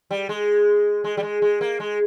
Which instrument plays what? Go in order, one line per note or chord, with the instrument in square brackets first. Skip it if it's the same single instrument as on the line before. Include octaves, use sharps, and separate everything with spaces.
[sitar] G3
G#3
G#3
G3
G#3
G#3
A#3
G#3